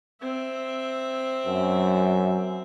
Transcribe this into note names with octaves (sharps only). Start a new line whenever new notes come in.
C4 E5
F#2